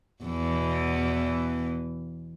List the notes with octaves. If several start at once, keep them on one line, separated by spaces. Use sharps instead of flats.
E2 B2 E3